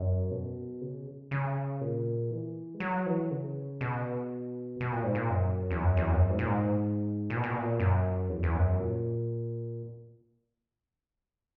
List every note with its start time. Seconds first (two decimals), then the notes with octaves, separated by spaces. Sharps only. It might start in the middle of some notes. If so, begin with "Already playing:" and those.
Already playing: F#2
0.31 B2
0.81 C#3
1.31 C#3
1.81 A#2
2.31 E3
2.74 G#3
2.80 F#3
3.06 E3
3.31 C#3
3.81 B2
4.81 B2
4.92 A#2
5.04 G#2
5.15 A#2
5.30 F#2
5.71 E2
5.80 F#2
5.97 E2
6.13 F#2
6.30 G#2
6.39 A#2
6.47 G#2
7.30 A#2
7.37 B2
7.44 A#2
7.52 B2
7.58 A#2
7.80 F#2
8.29 E2
8.43 E2
8.55 F#2
8.79 A#2